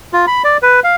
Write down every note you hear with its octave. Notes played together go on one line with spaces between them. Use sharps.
F4
B5
D5
B4
F5